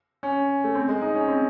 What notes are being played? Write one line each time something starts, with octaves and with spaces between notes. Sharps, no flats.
C#4
A3
C4
G#3
D#4
C#4
C4